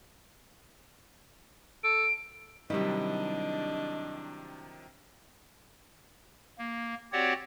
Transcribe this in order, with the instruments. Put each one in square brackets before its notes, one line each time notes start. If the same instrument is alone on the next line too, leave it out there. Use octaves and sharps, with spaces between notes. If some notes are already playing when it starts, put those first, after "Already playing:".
[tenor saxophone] A4 [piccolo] D7
[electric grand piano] C3 D#3 [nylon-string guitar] F#3 G3 E4 [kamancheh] D4 [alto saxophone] D#5
[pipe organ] A#3
C4 F#4 G4 C#5 D5 F#5